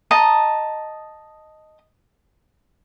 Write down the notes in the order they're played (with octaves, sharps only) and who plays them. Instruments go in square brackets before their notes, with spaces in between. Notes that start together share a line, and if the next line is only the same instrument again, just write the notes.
[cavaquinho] D#5 A5 A#5